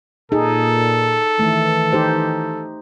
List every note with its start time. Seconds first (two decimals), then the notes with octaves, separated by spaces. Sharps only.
0.32 A#2 D#4 G#4 A4
1.39 D#3 E3 A3
1.92 D#4 G4 C5